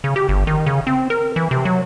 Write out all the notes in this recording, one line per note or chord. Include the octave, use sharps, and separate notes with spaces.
C#3
G4
G1
D#3
C#3
C4
A#4
E3
C3
F#3